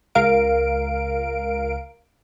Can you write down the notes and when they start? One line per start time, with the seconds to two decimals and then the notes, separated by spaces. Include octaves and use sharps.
0.15 C#2 A#4 F5 D7